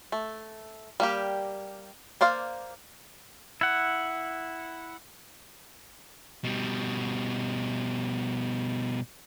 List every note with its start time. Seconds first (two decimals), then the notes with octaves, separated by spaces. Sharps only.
0.12 A3
1.00 G3 A#3 G4
2.21 A#3 C5 D5 F5
3.61 E4 F#5
6.44 B2 G3